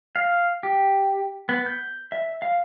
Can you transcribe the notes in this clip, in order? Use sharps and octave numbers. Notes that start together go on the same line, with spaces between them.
F5
G4
B3
G6
E5
F5